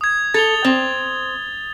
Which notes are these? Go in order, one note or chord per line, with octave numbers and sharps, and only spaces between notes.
D#6 G#6
A4 A6 F7 G7
C4